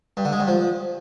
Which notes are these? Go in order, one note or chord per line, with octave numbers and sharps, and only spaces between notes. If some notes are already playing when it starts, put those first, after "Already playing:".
G2
D3
G#3
G2
F3